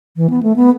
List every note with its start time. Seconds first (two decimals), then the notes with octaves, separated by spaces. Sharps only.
0.17 E3
0.30 B3
0.43 A3
0.56 B3